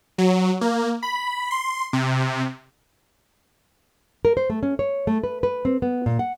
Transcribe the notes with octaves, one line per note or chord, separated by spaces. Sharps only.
F#3
A#3
B5
C6
C3
A#4
C5
A3
C#4
C#5
A3
B4
B4
C4
B3
A#2
F#5